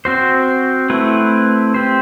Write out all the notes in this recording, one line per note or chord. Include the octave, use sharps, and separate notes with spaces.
C4 F#4 C5
A3 C4 E4 B4
C4 G4 C5